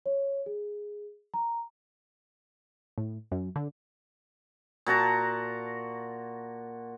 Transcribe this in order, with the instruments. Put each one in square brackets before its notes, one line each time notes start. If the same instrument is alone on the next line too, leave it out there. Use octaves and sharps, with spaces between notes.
[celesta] C#5
G#4
A#5
[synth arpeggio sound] A2
F#2
D3
[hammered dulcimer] A#2 F#4 A5 A#5